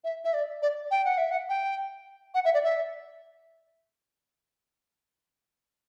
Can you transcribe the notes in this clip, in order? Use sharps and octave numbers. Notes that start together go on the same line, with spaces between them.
E5
E5
D5
D5
G5
F#5
E5
F#5
G5
F#5
E5
D5
E5